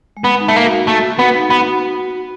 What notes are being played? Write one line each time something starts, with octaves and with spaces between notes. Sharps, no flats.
G#3
B3
D#4
A3
A#3
F#4
A3 F#4
F#4
B3
D#4
B3
F#4